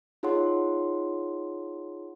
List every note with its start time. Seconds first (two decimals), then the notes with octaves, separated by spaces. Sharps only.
0.23 D#4 F4 G#4 C#5 F#5 C6